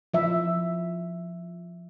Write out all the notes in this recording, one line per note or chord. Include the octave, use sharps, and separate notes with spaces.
F3 E5